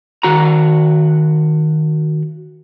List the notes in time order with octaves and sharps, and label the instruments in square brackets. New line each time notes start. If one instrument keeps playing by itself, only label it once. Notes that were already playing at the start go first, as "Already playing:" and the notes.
[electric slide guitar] D#3 F#4 A#5